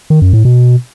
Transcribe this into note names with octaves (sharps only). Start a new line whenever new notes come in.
D#3
F#2
A2
B2